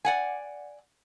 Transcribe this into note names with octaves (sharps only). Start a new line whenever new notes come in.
D5 F#5 G#5